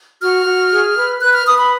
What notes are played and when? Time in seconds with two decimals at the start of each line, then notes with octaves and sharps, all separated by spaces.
0.22 F#4 F6
0.46 F#4
0.71 G#4
0.96 B4
1.21 B4 F#6
1.34 F6
1.46 B4 D#6
1.59 B5